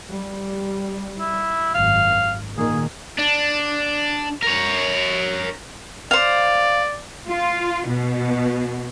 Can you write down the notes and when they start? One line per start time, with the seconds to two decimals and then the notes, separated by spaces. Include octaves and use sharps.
0.11 G3
1.19 E4
1.74 G#1 F#2 F5
2.57 A#2 D#3 A#3 G#4
3.18 D4
4.43 A#4 C#5
6.11 C5 D5 F5
7.28 F4
7.86 B2